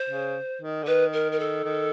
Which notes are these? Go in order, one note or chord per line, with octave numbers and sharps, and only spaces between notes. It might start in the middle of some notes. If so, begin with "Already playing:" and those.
Already playing: C5
C#3
D#3
D3
D#3 B4
A#4
A#4
A4
D#3